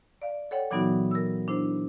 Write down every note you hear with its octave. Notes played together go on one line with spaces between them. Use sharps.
D5 F5
A4 C#5 F#5 G5
A#2 E3 F#3 B3 D#4 F#4
A#4 E6
D4 E4 C5